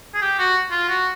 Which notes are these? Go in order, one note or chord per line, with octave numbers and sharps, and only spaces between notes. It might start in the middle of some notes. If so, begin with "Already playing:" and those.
G#4
G4
F#4
F4
F#4